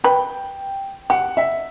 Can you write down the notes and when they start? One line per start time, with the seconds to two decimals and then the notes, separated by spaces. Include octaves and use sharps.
0.04 B4 G5
1.10 G4 F#5
1.37 E5